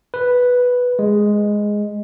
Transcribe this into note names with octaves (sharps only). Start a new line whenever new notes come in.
B4
G#3